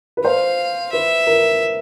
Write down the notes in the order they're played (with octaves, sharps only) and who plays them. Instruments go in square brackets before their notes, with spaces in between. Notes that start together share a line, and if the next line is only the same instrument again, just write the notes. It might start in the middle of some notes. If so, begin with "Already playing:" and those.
[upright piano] B4
[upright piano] C5 [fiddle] F5
[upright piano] B4 [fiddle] E5
[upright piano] A#4